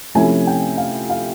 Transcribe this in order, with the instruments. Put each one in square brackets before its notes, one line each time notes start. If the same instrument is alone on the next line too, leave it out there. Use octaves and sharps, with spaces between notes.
[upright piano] C3 F3 A3 C#4 E4 G#5
G5
F5
F5